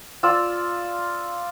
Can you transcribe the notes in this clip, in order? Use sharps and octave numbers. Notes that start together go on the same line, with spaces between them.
F4 D5 E6